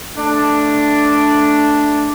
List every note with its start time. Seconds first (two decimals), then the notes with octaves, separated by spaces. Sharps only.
0.17 A3 D4